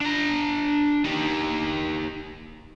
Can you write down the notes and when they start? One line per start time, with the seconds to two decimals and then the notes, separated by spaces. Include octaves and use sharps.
0.01 D4 A#5
1.05 D#4 G4